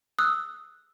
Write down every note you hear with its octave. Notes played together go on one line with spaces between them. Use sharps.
D#6 E6 F#6